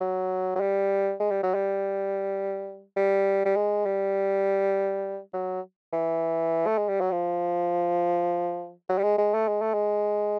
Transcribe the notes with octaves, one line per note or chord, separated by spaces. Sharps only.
F#3
F#3
G3
G#3
G3
F#3
G3
G3
G3
G#3
G3
F#3
E3
A3
G#3
G3
F#3
F3
F#3
G3
G#3
G#3
A3
G#3
A3
G#3